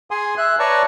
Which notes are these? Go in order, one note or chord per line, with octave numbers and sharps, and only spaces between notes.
G#4 G#5 C6 D#6
E5 F#6
B4 C#5 D5 A5 A#5 C#6